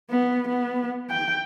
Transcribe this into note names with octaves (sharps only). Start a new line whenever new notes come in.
B3
B3
G5